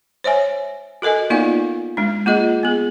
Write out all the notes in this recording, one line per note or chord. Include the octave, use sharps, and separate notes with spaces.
C5 C#5 E5 G#5
F#4 A4 A#4 D#5 G#5
A#3 B3 D#4 F4 D5 F5
G#3 D4
A#3 F4 G#4 D#5
B3 G#4